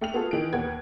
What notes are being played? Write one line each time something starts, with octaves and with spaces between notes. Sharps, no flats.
A3 G5 F6 F7
B3 F4 F#4 G#4 A4
D#3 E3 G#4 D7
D#2 B3 F#5 G#6